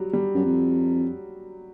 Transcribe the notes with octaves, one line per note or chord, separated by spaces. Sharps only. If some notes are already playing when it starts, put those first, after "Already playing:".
Already playing: F#3 G3
G3
F#2
F2